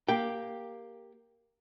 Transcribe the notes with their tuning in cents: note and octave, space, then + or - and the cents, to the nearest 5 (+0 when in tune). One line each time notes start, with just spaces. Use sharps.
A#3 +0 G4 +5 G5 +0